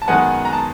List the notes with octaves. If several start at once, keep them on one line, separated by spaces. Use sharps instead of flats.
A5
F#2 D#3 G#3 B3 F#5 G#5
A#5
A5